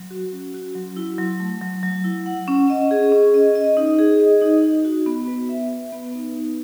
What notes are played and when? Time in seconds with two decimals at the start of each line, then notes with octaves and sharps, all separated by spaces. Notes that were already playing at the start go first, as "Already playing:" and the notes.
Already playing: F#3
0.11 F#4
0.32 C#4
0.54 F#4
0.75 F#3
0.97 E4
1.18 F#3
1.40 A3
1.61 F#3
1.83 F#3
2.04 E4
2.26 F#5
2.48 C#4
2.70 D#5
2.91 G#4
3.12 C#4
3.34 D#5
3.55 D#5
3.77 D#4
3.99 G#4
4.20 D#5
4.42 D#4
4.64 D#4
4.85 F#4
5.06 B3
5.27 B4
5.49 E5
5.71 B4
5.92 B3
6.15 D#4
6.36 D#4